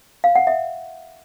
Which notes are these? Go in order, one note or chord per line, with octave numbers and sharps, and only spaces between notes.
F5
F#5
E5